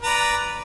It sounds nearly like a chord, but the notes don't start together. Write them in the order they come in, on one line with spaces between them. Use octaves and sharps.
B4 A#5 D5